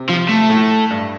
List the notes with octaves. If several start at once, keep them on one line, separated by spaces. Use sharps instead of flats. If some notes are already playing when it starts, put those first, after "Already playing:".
Already playing: C3
F3
A3
A2
G2